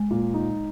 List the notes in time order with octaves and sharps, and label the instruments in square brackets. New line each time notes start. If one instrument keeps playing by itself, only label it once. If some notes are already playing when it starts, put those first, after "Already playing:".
Already playing: [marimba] G#3
[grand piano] A#2
D#4